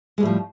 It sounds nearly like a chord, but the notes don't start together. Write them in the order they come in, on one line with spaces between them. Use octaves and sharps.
G#3 G3 A2 F3